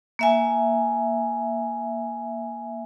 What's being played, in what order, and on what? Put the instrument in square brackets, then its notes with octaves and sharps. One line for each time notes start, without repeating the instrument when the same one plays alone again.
[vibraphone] A#3 E5 G#5